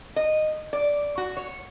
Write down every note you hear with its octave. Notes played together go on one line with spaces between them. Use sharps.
D#5
D5
F#4
C#5